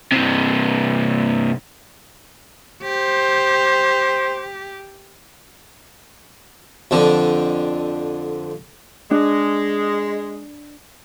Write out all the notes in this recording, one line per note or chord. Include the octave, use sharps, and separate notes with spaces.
G2 C3
G4 C5
F2 D3
G#3 D4